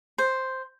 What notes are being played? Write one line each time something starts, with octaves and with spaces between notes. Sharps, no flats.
C5